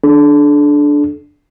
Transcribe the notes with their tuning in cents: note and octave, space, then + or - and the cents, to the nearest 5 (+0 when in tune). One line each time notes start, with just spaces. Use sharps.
D4 +0 A4 -35